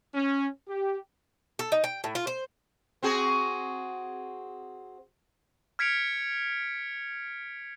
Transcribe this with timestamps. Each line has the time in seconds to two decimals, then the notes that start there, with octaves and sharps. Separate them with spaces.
0.14 C#4
0.68 G4
1.59 A4
1.72 D#4
1.84 G5
2.04 A2
2.15 F4
2.27 C5
3.03 C4 F#4 G#4
5.79 F6 G#6 B6 C#7 D7 F7